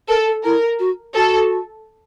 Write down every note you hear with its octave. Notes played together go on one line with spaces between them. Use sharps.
A4 A#4
A4
E4 A#4
F#4
F#4 A4